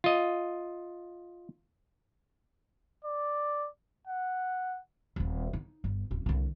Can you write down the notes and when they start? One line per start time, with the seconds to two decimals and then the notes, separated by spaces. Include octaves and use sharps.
0.04 F4 D#5
3.05 D5
4.07 F#5
5.16 D#1 C4
5.53 D#4
5.84 G1
6.11 D1 C#4
6.26 C2 D3